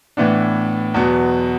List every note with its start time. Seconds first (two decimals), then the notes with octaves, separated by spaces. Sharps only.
0.17 A2 E3 B3 D4
0.94 E2 B2 F#3 B3